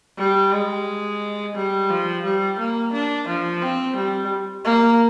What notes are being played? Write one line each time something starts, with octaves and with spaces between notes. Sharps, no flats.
G3
G#3
G3
F3
G3
A#3
D4
F3
C4
G3
A#3